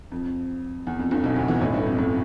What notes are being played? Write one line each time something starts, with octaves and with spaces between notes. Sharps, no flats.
F2
E2
F2
G1 G2
B1 B2
D2 D3
E2 E3
A1 A2
G1 G2
F2
A1 A2